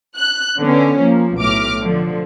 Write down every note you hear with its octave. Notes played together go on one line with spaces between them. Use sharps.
F#6
D3 B3 C#4
F3 A#3
B1 A2 D6 F6
D3 F3